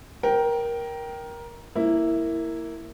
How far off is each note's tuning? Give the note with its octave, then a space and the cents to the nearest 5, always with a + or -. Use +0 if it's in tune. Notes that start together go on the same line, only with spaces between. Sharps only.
A#4 +15 G5 -10
A#3 -10 E4 +0